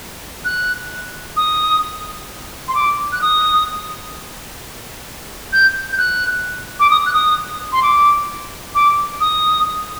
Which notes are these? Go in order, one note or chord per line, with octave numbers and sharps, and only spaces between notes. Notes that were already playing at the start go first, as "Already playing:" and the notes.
F#6
D#6
C6
D6
F#6
D#6
G6
G6
F#6
D6
D#6
F#6
D#6
C6
D6
D6
D#6